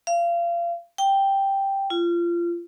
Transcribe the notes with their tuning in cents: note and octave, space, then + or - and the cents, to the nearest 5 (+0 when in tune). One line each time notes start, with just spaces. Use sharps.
F5 -30
G5 +0
F4 -25